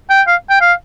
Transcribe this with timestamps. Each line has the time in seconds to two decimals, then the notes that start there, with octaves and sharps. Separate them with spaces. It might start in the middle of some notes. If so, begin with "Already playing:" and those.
0.10 G5
0.27 F5
0.50 G5
0.61 F5